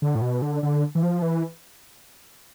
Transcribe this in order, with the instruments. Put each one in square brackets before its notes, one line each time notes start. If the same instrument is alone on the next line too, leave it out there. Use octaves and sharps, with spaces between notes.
[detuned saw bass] D3
A2
B2
D3
D3
E3
F3
E3